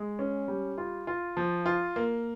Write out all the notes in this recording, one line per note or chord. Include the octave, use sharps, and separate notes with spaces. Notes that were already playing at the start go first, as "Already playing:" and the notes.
Already playing: G#3
C#4
G3
F4
F4
F3
F4
A#3